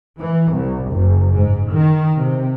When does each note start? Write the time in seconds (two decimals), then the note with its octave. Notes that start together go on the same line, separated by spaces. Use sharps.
0.19 E3
0.50 C2
0.90 F#1
1.36 G#2
1.71 D#3
2.18 C3